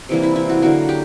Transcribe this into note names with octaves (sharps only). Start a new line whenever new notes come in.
C3 E3 G3 A#3
E4
E4
F#4
D3 F#3 A#3 F#4
G4